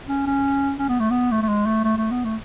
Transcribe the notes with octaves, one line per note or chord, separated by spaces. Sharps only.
C#4
C#4
C#4
B3
A3
B3
A3
A3
G#3
A3
A3
A3
B3
A3